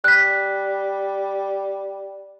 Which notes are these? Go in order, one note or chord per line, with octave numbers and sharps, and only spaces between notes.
G3 F#6 B6